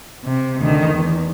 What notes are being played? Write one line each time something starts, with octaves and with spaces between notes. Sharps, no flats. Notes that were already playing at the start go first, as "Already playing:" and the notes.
C3
D2 D#3
E2